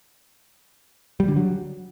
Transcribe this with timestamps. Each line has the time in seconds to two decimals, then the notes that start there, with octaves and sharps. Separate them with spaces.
1.20 G3
1.28 D3
1.36 F#3